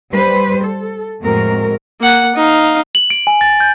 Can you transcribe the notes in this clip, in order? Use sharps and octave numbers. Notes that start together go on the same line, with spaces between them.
G3 B4 C5
A4
F2 A2 G#3 C4 F#4 A#4
A#3 F#5
D#4 F5
F#7
D7
G#5
A6
G6